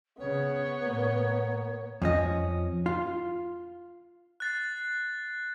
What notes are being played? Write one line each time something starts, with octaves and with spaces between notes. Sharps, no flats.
C#3 B3 C#5
A2 A#3
F2 C#4 D#5
F4
F#6 A6 C7